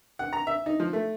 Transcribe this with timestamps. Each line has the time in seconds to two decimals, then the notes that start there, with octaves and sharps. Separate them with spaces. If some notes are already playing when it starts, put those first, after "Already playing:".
0.19 F#5
0.33 A#5
0.47 E5
0.66 D#4
0.80 F3
0.93 A3